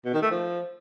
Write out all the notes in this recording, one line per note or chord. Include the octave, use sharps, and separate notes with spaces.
B2
D#3
A3
F3